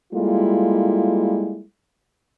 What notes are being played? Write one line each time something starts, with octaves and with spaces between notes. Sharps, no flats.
G3 G#3 A#3 E4 F4 A4